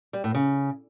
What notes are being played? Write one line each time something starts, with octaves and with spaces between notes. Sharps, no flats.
G3
A2
C#3